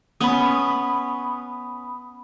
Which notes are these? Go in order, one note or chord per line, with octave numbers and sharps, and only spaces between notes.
B3 C#4 B5 D#6